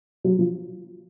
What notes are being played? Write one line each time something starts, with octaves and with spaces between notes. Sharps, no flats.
F#3
F3